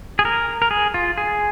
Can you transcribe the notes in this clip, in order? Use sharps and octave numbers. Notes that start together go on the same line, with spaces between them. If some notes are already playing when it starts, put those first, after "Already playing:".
G#4
A#4
A#4
G#4
F4
G#4